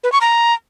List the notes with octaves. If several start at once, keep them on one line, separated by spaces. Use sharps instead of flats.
B4
C#6
A#5